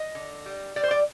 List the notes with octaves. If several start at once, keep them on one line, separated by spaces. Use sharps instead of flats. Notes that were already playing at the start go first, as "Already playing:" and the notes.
Already playing: D#5
D3
G3
G3 D5
C5
D5